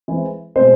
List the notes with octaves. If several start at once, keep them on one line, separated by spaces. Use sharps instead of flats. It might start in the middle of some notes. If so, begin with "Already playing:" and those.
E3 G#3 C4
B2 G#3 C4 C5